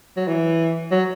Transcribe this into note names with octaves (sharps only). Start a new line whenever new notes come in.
F#3
E3
F#3